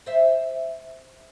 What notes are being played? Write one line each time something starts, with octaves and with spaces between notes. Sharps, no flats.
C5 E5